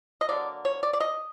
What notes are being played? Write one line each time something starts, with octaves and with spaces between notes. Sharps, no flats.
D#5
D3 F#3 A#3 D5
C#5
D5
D5
D#5